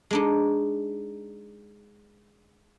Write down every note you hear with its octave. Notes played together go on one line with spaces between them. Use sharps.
G#3 D4 D#4